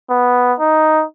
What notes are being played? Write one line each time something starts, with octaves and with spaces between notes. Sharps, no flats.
B3
D#4